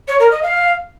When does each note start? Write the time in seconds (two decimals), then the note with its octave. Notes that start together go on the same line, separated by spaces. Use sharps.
0.08 C#5
0.19 A#4
0.31 D#5
0.42 F5